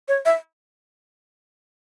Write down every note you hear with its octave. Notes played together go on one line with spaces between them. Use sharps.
C#5
E5